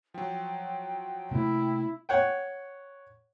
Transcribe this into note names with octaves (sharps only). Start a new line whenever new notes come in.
F3 F#3 G5
C3 A3 A#3 E4
C#5 F#5 G5